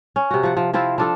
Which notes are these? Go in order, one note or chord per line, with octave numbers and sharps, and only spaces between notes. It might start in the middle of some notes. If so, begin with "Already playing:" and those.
C#4
C3 F#4
F3 F#5
F3
F3 C4 E4 F4
F3 D4 A4